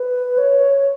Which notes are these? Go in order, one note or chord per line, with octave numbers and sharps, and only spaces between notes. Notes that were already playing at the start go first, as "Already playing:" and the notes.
Already playing: B4
C#5